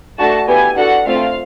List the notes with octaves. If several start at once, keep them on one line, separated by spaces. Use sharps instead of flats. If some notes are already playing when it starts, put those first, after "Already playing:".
A3 D4 F#4 A5
B3 E4 G4 G#5
D4 F#4 A4 F#5
A3 C4 F4 F5